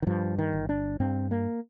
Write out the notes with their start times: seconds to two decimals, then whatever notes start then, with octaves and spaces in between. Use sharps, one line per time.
0.02 D#3
0.07 G2 F3
0.39 D#3
0.53 G1
0.69 D4
1.00 G2 C4
1.31 A#3